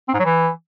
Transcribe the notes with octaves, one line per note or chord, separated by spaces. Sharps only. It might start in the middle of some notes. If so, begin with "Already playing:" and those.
C4
G#2
F#3
E3